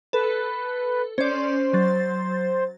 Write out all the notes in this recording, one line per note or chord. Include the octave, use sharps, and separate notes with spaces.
A4 B4
C#4 C5 D5
F#3 A6